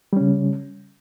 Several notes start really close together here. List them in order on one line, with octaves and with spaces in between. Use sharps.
G3 C#4 C#3